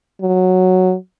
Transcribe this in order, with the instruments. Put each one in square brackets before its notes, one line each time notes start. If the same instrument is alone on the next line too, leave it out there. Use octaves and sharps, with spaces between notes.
[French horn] F#3